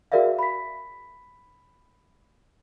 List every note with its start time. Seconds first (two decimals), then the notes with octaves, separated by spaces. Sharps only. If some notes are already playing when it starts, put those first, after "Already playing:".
0.12 F#4 G#4 A#4 D5 E5 F5
0.39 B5 B6